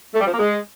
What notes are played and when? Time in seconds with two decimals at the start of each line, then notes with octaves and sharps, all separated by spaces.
0.14 A3
0.20 G3
0.26 F3
0.32 A#3
0.38 G#3